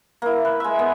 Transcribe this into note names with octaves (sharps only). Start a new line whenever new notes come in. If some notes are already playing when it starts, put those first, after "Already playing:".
A#3 E4
B4
G#3 E5
B3